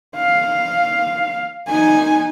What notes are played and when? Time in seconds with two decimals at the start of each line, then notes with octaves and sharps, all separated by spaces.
0.16 F5
1.69 D#4 G#5